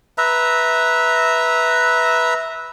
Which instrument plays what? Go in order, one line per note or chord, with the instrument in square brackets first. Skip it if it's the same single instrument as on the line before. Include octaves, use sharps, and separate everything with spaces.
[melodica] B4 E5 A#5